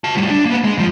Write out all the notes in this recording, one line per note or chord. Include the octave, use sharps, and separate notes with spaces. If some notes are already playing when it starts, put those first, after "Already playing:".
F#4 A5
A2 G3
D4
A#3 B3
G#3
E2 F3